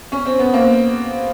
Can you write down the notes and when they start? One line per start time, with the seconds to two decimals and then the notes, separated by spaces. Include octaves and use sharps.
0.12 C#4
0.25 C4
0.39 B3
0.53 A#3 C4